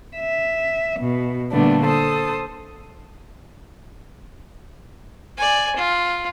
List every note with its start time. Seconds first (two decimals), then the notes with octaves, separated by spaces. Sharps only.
0.17 E5
0.99 B2
1.52 A#2 D3 G3 A3 B3 D4
1.85 A4 C5 A5 D#6
5.37 D5 G#5
5.76 F4